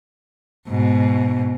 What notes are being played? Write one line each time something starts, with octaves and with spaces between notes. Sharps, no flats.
G#2 B2